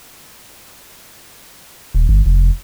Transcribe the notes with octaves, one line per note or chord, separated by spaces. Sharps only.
D#1
G1
F1